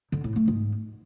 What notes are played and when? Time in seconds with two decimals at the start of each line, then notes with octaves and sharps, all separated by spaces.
0.12 D3
0.24 A2
0.36 A3
0.48 G#2